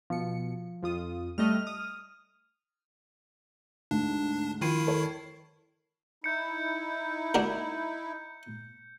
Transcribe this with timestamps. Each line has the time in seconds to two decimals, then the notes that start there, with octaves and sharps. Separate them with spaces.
0.10 B2 F3 C#7
0.82 F2 F4 D#6
1.38 G3 A3 D#5 F6
1.67 D#6
3.91 D2 G#2 D4
4.61 D#3 F3 E4 C6 C7 D#7
4.87 A4 A#4 C#5
6.24 D#4 E4 G6 C#7
7.34 D4 F#4 A#4